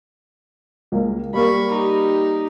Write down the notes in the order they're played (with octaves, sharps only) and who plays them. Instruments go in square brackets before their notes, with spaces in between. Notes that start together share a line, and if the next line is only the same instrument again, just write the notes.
[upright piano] C#2 A#3
[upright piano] G3 A#3 A#4 [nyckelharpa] B5 C#6
[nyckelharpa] D#4 G4